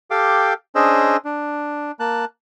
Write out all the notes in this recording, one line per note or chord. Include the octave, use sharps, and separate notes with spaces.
G4 A4 F5 G5 D6
C#4 D4 G#4 C5 D#5 E6
D4
A#3 A5 F#6